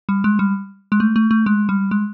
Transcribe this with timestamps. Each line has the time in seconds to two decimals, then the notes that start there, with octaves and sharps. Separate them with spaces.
0.09 G3
0.24 G#3
0.39 G3
0.92 G#3
1.00 A3
1.16 A3
1.31 A3
1.46 G#3
1.69 G3
1.91 G#3